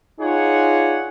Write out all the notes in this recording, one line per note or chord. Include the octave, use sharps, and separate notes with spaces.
D#4 F4 G#4 C#5 D5 F#5